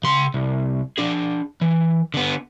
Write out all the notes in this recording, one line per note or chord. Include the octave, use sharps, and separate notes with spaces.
C#3 C6
C2
D4 G#4
E3
D3 B3